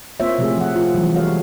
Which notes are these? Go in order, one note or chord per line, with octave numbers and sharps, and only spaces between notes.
A#3 C4 F4 C5 C#5 E5
C3 F3 A3 C4 G4 G#4
F3 F#5
F4
E3 F#3 G3
G#3 F#4 A4 C#5 F5